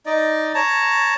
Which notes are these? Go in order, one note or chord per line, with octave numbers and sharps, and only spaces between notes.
D#4 D5 D#5
C#5 A5 A#5